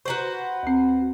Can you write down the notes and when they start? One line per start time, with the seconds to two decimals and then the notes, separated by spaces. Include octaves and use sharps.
0.06 F#4 B4 C5 A#5 C#6
0.63 D2 C4